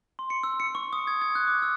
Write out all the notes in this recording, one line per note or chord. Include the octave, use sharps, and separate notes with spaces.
C6
C#7
E6
C#7
C#6
D#6
G#6
G#6
F#6
D6
E6